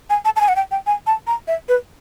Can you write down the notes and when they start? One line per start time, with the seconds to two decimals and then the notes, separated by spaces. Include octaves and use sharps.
0.10 G#5
0.25 A5
0.36 A5
0.41 G#5
0.48 F#5
0.56 G5
0.71 G5
0.87 G#5
1.07 A5
1.27 A#5
1.48 E5
1.69 B4